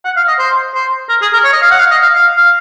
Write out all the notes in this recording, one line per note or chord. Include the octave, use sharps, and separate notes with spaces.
F#5
F5
D#5
C5
C5
A#4
G#4
A#4
C#5
D#5
F5
F#5
F5
D#5
F5
F5
F5